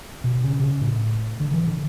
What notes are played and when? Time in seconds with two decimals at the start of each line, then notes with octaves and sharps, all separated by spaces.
0.24 B2
0.44 C#3
0.63 C#3
0.81 A2
1.40 D3
1.54 E3
1.68 D3